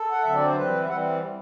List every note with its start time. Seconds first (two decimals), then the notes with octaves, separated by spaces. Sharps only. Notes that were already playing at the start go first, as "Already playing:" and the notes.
Already playing: A4
0.11 F#5
0.23 D3 F#3 C4 E5
0.34 D5
0.45 C5
0.56 E3 G3 C4 B4
0.83 E5
0.88 E3 G3 C4 F#5